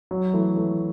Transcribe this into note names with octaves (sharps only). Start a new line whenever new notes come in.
F#3
E3 A3
E3 A3